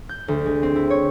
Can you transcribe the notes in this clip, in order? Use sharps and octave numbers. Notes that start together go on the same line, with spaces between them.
G6
D2
G#3
C4
E4
C#5